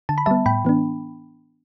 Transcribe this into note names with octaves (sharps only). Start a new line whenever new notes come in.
D3 A5
B5
G3 B3 E5 A5
A2 G5 B5
E3 B3 D4